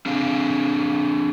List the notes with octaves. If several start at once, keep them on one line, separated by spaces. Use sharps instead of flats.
C4 D4 G#4 F5